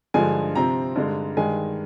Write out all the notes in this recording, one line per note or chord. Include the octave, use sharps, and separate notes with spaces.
G2 D3 F3 G#3 G#5
C3 F3 C4 A#5
G2 D3 G#3
G2 D#3 G#3 G#5